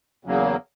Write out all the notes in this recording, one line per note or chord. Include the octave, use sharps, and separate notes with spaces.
E2 C#3 F#3 A#3